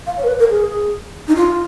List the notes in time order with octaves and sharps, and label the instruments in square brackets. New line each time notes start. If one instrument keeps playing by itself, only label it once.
[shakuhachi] F5
C#5
A#4
B4
A#4
G#4
D#4
F4